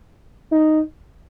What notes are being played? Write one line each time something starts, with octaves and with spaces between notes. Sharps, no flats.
D#4